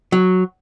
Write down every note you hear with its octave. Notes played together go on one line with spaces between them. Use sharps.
F#3